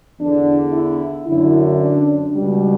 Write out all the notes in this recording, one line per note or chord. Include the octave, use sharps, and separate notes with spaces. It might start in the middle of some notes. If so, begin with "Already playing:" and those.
E2 D3 D4
E4
F#2 D3 E4
D4
C#2 B2 G3